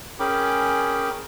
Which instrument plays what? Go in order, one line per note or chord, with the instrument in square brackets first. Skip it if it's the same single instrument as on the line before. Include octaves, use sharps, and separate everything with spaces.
[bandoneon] C#4 G#4 A#4 G5 B5 D6